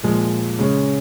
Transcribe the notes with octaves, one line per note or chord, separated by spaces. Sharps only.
A#2 F3 G#3
C#3 G#3 C#4